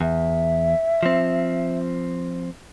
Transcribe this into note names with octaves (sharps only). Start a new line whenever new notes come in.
E2 E5
F3 C4